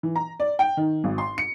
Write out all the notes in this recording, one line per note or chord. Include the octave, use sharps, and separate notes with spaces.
E3
A#5
D5
G5
D#3
G#1
C6
C#7